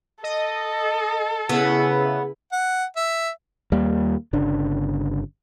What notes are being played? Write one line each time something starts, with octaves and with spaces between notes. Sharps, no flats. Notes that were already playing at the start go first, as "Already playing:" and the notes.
A4 D#5
C#3 B3 E4 G#4 B4 E6
F#5
E5
D#2 G3 A#3
G1 C#3 D4